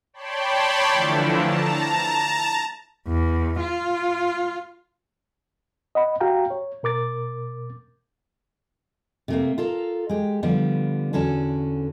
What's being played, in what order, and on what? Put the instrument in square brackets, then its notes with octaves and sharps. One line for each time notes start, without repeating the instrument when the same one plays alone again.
[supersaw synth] C#5 D5 G5 A5 B5 C6
D3 E3 F3 A3 D4 E4
A5 A#5
[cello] E2
F4
[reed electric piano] D#5 F#5 B5
F#4 G4 F5 G5 A#5
C#5
B2 A#4 D6 A6
[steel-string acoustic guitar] C3 A3 A#3
F4 A4 A#4
G#3 G4
D3 F3 G3 B3
E2 D3 C#4 F#4 A4